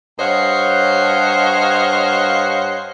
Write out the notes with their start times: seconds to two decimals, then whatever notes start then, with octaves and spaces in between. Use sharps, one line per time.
0.19 G2 C5 C#5 D#5 F5 F#5